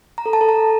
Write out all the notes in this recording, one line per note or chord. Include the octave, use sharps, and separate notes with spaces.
A#5
A4
A5
A4
A#5